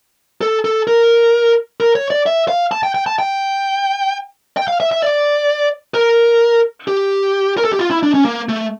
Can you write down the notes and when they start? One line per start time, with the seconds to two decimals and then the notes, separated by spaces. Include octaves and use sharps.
0.41 A4
0.65 A4
0.87 A#4
1.80 A#4
1.95 C#5
2.10 D5
2.26 E5
2.48 F5
2.72 A5
2.83 G5
2.95 G5
3.06 A5
3.19 G5
4.57 G5
4.68 F5
4.80 E5
4.91 E5
5.02 D5
5.94 A#4
6.88 G4
7.58 A#4
7.65 A4
7.73 G4
7.79 F4
7.91 E4
8.03 D4
8.14 C#4
8.25 A#3
8.49 A3